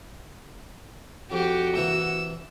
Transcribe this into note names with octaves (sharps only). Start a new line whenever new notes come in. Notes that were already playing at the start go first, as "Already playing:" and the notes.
F2 F#4 G4
C2 E3 A#3 E6